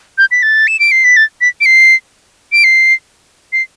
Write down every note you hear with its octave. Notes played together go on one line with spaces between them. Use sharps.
G6
B6
A6
E7
D7
C7
B6
A6
B6
D7
C7
D7
C7
C7